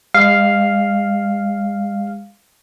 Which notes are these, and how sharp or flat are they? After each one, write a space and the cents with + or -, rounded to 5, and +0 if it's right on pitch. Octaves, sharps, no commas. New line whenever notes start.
G#3 -40 F5 +0